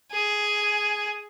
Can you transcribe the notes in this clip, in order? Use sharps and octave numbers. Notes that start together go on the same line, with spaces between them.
G#4